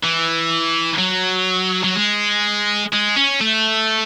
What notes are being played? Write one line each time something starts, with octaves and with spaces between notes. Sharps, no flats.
E3
F#3
F#3
G#3
G#3
C#4
A3